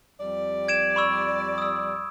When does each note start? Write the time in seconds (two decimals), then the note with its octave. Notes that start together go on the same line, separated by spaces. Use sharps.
0.20 F2 G3 D5
0.68 G#6 D7 E7
0.96 B5 C#6 E6
1.58 D#6 E6